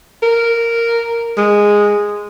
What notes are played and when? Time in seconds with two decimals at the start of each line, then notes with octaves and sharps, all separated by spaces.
0.23 A#4
1.37 G#3